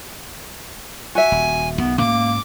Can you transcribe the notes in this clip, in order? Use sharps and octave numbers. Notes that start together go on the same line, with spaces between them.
F#4 E5 G#5
D#1
B1 D#3 B3
G#2 A#3 C#4 D6